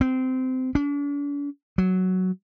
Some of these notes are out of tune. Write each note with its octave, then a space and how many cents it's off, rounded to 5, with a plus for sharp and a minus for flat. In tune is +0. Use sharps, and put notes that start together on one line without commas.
C4 -20
D4 -45
F#3 +5